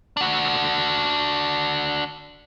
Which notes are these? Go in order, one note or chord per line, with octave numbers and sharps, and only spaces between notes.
D4 F#4